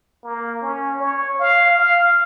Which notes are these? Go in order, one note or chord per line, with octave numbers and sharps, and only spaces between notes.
A#3
C#4
C#5
F5
F5